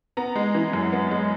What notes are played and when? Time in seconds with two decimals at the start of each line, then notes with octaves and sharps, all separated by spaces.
0.17 B3 A#5
0.36 G#3
0.55 E3
0.73 F#2
0.92 B3
1.11 G#3